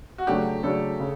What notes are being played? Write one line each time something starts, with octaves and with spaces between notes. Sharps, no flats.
F#4
C#3 F#3 A3 D4 G4
C#3 F#3 A3 D4 A4
C#3